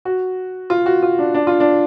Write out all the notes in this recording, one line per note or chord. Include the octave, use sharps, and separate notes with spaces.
F#4
F4
F#4
F4
D4
D4
F4
D4